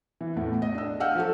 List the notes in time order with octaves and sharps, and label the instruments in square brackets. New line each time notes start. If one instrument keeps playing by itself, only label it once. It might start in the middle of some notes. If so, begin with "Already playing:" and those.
[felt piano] E3
E2 A2
D#5
D4 E6
D#5 F5 F#5 E6 F6 G6
F3 F#3 F#4 A4